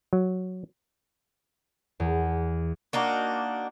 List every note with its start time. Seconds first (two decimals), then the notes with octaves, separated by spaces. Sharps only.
0.13 F#3
2.00 E2
2.93 A#3 D4 D#4 F#4